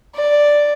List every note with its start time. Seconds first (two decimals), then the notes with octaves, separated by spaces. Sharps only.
0.15 D5